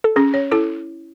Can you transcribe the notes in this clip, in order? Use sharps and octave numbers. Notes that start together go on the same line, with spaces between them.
A4
C#4 G#4
C#5
E4 A4